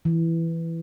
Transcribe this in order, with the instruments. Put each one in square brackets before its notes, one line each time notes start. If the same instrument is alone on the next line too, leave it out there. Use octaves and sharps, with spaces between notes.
[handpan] E3